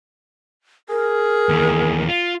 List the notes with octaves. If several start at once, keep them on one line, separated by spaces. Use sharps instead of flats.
G#4 A#4
D#2 E3
F4